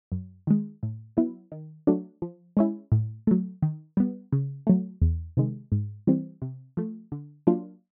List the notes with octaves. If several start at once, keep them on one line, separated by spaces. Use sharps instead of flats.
F#2
D#3 G#3
A2
F#3 B3 E4
D#3
F#3 A3 D4
F3
G#3 C#4 E4
A2
F#3 A3
D#3
G3 B3
C#3
F#3 A3
E2
C3 D#3 G#3
G#2
E3 G3 C4
C3
F3 A3
D3
F#3 A#3 D4 F4